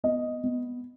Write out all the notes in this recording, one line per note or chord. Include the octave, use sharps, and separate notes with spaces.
B3 D#5
B3